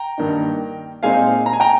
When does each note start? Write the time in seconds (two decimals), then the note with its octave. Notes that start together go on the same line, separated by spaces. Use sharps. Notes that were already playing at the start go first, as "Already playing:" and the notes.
Already playing: G5 A#5
0.18 G2 D#3 A#3 D#4
1.03 A#2 G#3 C4 D#4 F5 G#5
1.46 A#5
1.53 G#5
1.60 G5 A#5